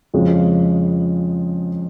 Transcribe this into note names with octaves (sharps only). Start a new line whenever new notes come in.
F2 C#3 F3 G#3